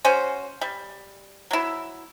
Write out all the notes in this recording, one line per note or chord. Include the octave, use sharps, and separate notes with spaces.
C#4 F#4 C5
G3
F#3 E4